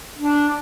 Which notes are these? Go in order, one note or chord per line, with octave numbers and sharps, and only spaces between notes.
D4